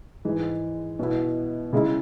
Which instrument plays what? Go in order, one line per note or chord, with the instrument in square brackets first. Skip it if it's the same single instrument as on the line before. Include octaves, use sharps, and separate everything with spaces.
[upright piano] G#2 E3 G#3
B2 B3 E4
C#3 G#3 E4